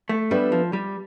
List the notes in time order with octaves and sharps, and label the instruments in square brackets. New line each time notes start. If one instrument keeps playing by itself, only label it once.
[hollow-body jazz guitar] A3
[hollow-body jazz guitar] G3 [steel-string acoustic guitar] B3 D4 A4 E5
[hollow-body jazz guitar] F3
G3